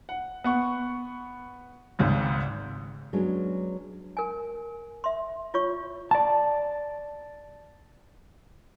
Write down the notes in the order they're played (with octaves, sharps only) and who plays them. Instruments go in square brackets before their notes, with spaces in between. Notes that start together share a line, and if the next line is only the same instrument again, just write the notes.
[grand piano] F#5
B3 F#5 C#6
G#1 C#2 G#2
[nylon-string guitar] F#3 G#3 B3 C#4 D4
[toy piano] A#4 G#5
E5 C6
F4 C#5 C#6
[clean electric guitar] D5 A5